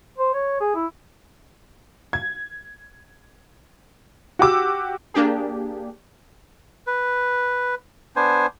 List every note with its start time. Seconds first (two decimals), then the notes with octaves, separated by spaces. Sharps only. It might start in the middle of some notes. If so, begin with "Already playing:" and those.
0.18 C5
0.34 C#5
0.61 G#4
0.75 E4
2.13 G#6
4.39 F#4 G4 D6 E6
5.14 A#3 D4 G4 G#4
6.87 B4
8.16 B3 D4 C5 G#5